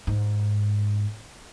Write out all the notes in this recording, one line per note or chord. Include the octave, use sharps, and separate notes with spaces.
G#2